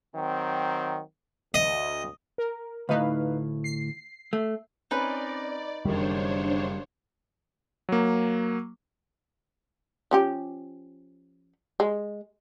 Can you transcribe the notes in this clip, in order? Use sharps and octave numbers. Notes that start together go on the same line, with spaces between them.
D#3 F#3 C4
D2 D#5
A#4
D2 A2 D#4 B4 F5
C7
A3
C4 C#4 D#4 B4 D5 G#5
F#1 D#3 G3 D4 C5 C#5
F#3 A#3
F3 C#4 G4
G#3